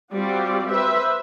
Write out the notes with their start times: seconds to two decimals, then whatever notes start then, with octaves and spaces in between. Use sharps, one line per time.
0.12 G3 C4 F4 F#4 D5
0.68 B4 C5 E5